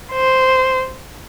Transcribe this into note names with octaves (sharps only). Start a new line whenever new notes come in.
C5